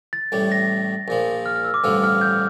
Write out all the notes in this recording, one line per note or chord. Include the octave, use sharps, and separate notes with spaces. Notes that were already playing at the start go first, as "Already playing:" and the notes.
A6
A1 A2 G3
A#6
A#1 A#2 F3
F6
F6
E6
D6
A1 G2 D3 F3 E6
F6
G6